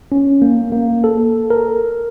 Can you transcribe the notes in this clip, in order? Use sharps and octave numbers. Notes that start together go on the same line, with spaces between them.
C#4
A#3
A#3
A4
A#4